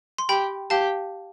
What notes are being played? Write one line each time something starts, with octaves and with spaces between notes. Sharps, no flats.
C6
G4 G5 B5
G4 F5 A5